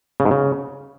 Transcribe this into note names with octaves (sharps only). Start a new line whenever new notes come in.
C#3
G#2
C#3